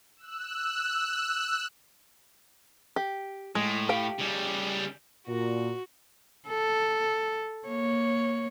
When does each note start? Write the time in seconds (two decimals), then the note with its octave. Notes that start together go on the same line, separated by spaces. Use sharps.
0.17 E6 F#6
2.96 G4
3.55 A2 G#3
3.89 G4 F5 G5
4.18 C#3 G3
5.28 A#2 F#4
6.48 A4
7.68 A#3 C#5